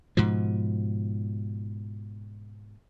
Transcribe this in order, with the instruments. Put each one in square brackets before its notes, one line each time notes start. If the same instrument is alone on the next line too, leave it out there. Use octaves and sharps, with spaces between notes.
[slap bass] G#2 B2 F3